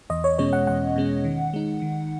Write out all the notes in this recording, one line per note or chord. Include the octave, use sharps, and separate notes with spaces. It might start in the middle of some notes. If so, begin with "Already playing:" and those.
E2 D#5
C#5
B2 G#3 C#4 C#5
F#5
E2 F#5
B2 G#3 C#4
D#3
G#3 D#4
D#3